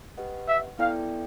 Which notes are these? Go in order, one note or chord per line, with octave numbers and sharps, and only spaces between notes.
G4 B4 D#5 F#5
E5
B3 E4 A4 D5 F5 G5